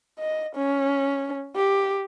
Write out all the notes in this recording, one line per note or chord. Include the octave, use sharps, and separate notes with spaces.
D#5
C#4
G4